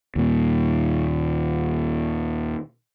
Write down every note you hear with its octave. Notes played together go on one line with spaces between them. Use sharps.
D#2 A#2